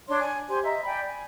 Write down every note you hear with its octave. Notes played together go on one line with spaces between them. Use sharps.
D4 C#5 C6
G#5
G4 C5 G#5 C6
D#5 E5 A#5
D5 G5 G#5 B5
G#5